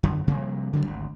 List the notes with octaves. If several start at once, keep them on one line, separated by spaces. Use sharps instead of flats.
F#2 D3
C3 F3 G3 A#3
C#3 F#3 G3 D4
G#1 D2